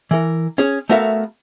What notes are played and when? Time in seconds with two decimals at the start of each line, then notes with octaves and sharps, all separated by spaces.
0.11 E3 A#4
0.58 C#4 G#4
0.89 A3 B3 F#4 A#4 E5 F5